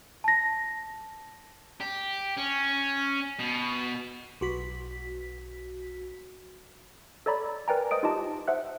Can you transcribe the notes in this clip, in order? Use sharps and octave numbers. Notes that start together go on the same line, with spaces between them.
A5 A#6
G4
C#4
B2
B1 F#4 B6
A4 C#5 D5 A#5 B5
A#4 B4 D5 G5 G#5 A#5
C5 D#5 D#6 D7
D#4 F4 G4 D#5 A5
C5 E5 F#5 F#6